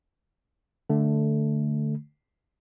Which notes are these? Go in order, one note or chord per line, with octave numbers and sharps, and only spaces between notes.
D3 A3